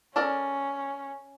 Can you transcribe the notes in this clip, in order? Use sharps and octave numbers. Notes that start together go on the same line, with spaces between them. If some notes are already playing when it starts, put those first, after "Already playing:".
C#4 A4 A#4 D5